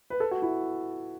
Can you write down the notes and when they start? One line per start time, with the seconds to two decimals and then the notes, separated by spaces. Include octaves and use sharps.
0.10 B4
0.20 A4
0.31 F#4
0.42 E4